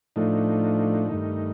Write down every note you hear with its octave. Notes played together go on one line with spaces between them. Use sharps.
A2 F3 A3 D4 D#4
G2 D#3 A3